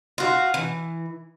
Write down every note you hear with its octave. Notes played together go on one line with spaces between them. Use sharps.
F4 F#4
E3